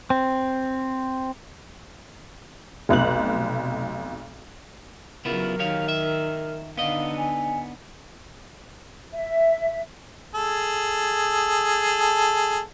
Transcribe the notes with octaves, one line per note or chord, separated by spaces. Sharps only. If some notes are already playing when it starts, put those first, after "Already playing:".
C4
F1 B1 F#6 F#7
C#3 F#3 B3 E4 F4 A#4
D#3 G4 C#5 F5
E5
D3 B3 D#4 D#5 F5
G#5
E5
G#4 A4